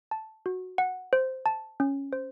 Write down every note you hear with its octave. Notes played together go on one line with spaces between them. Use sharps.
A5
F#4
F#5
C5
A5
C#4
C5